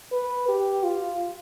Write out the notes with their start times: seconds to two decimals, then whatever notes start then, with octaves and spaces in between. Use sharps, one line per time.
0.12 B4
0.49 G4
0.84 F4